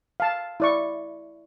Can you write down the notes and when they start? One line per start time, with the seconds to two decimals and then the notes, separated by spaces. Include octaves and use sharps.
0.20 F5 A5
0.60 E4 D5 C#6